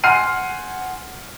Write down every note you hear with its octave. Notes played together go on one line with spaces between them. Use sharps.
F#5 G#5 C6 F6 C7 D#7